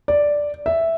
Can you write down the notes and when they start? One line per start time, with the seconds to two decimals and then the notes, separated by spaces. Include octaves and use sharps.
0.08 D5
0.66 E5